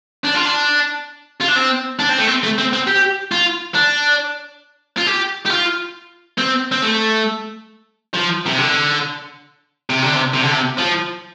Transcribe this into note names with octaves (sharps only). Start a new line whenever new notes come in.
D4
F4
D4
F4
D4
C4
D4
C4
A3
C4
A3
C4
C4
G4
F4
D4
F4
G4
G4
F4
C4
C4
A3
F3
C3
D3
C3
D3
C3
C3
D3
C3
F3